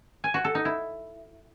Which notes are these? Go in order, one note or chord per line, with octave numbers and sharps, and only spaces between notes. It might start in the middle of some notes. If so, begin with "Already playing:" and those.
G#5
F#4
A4
D#4
E4